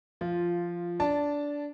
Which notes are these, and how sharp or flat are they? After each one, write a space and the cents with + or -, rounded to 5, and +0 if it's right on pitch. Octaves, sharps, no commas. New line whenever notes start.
F3 -10 F4 +0
D4 -15 A5 +0